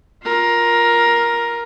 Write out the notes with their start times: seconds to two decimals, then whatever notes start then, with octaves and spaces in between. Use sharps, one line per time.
0.23 F4 A#4